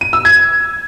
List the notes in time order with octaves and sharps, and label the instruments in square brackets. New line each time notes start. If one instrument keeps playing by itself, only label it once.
[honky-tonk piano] D#7
E6
G#6